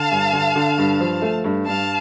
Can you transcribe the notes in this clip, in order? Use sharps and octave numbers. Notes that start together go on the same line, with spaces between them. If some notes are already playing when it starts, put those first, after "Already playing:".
Already playing: D3 F5 A5
G2
D3
D3
G2
F3
A3
G2
G2 F5 A5